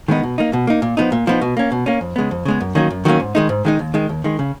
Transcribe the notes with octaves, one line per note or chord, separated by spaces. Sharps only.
D#3 G#3 B3 D#4
B2
A#3 D#4
B2
A#3 D#4
A#2
F3 B3 D#4
A#2
F3 B3 D#4
B2
A#3 C#4
B2
A#3 C#4
F2
C#3 G#3 B3
F2
C#3 G#3 B3
F#2
D#3 F#3 A#3 C#4
F#2
D#3 F#3 A#3 C#4
G#2
D#3 G#3 D#4
G#2
D#3 G#3 D#4
D#2
D#3 G#3
D#2
D#3 G#3
C#3